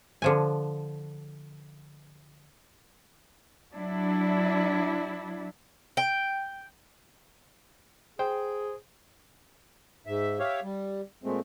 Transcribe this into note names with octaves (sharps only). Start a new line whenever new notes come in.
D3 F3 G#5
F#3 D4 E4
G5
G#4 C5 G5
G#2 E5
G4 C#5 E5 F5
G3
A#2 G#3 A3 C4